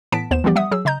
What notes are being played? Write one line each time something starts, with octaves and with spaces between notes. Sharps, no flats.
A2 E3 B3 A5 B6 D7
D#2 B3 C5 E7
E3 F3 G3 B3 G4 D5
G3 E5 F#5 D#6
F#3 G#4 E6
C#3 D#5 A#5 G6